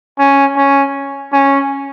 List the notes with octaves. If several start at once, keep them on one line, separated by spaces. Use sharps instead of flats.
C#4
C#4
C#4